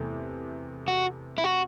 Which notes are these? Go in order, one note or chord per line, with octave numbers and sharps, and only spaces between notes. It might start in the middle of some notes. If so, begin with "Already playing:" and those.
Already playing: E2 C3 E3 A3
F#4
E4
F#4